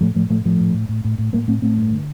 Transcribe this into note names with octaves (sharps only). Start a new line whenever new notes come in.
A2 F3 A3
A2 F3 A3
A2 F3 A3
A2 F3 A3
A2
A2
A2
A2
A2
A2 G3 A#3
A2 A3 C4
A2 A3 C4
G2
D3